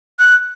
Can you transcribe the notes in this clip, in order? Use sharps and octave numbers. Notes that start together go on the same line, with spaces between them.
F#6